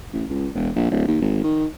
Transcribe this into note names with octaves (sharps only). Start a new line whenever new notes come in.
A1
C#2
E1
A#1
D1
D#2
G#1
D#3